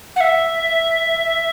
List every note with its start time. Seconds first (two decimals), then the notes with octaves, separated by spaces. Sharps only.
0.16 F#5
0.20 E5